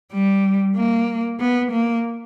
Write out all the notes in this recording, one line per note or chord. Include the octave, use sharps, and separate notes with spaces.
G3
A#3
B3
A#3